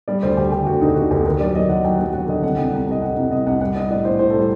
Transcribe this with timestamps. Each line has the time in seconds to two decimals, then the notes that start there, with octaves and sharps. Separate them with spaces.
0.08 G3 D5
0.23 D2 C5
0.37 D3 G4
0.52 D3 G4
0.66 D2 F#4
0.81 D3 D#4
0.96 D3 F#4
1.11 D2 G4
1.25 D#2 A#4
1.41 F#3 D5
1.55 F#3 D#5
1.69 D#2 F#5
1.84 F#3 G5
1.98 F#3 F#5
2.13 F#3 F#5
2.28 D3 D#5
2.43 C2 F#5
2.57 C2 G5
2.73 C2
2.87 C2 D#5
3.02 C3 F#5
3.17 C2
3.31 C2 D#5
3.47 C2 F#5
3.61 G3 F#5
3.76 G3 D#5
3.90 A2 D5
4.05 A2 C5
4.19 A2 C5
4.30 A4
4.34 G3 C5